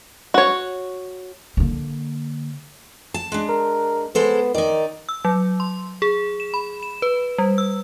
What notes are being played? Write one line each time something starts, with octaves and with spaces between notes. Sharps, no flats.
F#4 C#5
D3 A#3
A5
G#3 D4
A#4
G#3 B3 A4 C5
D#3 D#4 D5
E6
F#3
C6
G#4
E7
B5
E7
B4
G3
E6